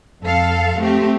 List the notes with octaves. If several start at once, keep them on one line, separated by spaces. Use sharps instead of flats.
F2 A4 F5
A3 C4 G4